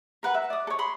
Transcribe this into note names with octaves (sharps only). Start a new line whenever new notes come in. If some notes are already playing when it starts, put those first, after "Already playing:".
A#4 B4 F#5
E5
D5 D#6
A4 C#5
B5 C6 D#6